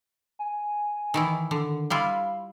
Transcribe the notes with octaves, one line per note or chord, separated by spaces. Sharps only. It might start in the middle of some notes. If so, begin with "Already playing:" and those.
G#5
D#3 E3 E4
D3 D#3
G3 E4 F4 F5